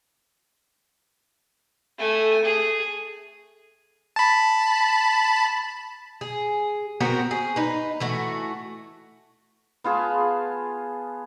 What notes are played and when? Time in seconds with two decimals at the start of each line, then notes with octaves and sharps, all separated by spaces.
1.98 A3 G#5
2.45 G#4
4.16 A5 B5
6.21 G#4
7.00 B3 C4 F#4 A#4
7.31 G#4
7.56 D#4 B4
8.00 E3 A3 F#4
9.84 B3 F4 G#4 A5